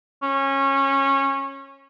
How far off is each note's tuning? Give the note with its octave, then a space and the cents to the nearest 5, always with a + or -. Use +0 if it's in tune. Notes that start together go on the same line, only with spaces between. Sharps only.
C#4 -20